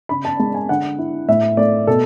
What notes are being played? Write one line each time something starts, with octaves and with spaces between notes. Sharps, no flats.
C#3 B5
A5
G#3 A5
G#5
D3 F#5
E4
A2 E5
A3 D5
B2 A4